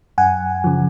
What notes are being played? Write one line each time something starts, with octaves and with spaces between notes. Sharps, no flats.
F#2 F#5 G#5
C#3 F3